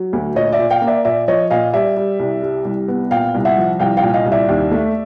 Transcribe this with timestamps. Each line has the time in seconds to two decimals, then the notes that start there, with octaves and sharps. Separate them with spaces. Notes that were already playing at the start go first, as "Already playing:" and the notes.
Already playing: F#3
0.13 D2
0.35 A#2 C#5 D#5
0.52 D5 E5
0.59 A#2
0.70 F5 G5
0.82 A#3
0.87 D5 E5
1.05 A#2 D5 E5
1.28 F3 C#5 D#5
1.50 A#2 D#5 F5
1.73 G3 D5 E5
1.97 G3
2.19 C2
2.43 G3
2.65 C2
2.88 B3
3.11 A#2 F5 G5
3.34 C2
3.45 E5 F#5
3.58 F3
3.79 C2 F5 G5
3.97 F5 G5
4.03 A#2
4.14 D#5 F5
4.26 C2
4.32 D5 E5
4.49 D#2
4.72 A3